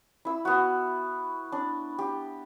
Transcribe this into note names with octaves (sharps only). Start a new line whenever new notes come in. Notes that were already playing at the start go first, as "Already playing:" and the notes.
E4 E6
B3 F#4
D4
G4